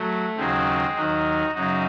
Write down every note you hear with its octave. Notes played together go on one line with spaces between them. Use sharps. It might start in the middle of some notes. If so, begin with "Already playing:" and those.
Already playing: F#3 A3
D#2 C#3 F#3 G#3 C4
D#2 D#3 F#3 D#4 F#4
F#2 C#3 F#3 D#4 F#4